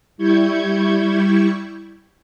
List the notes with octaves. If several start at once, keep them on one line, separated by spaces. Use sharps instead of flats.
G3 E4 C#6 G6 G#6